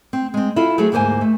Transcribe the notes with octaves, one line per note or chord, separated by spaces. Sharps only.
C4
G#3 C4
E4 F4 A4
F#3 A3 F#4 G#4 C5
D2 G#2 A#3 C5 G#5
A3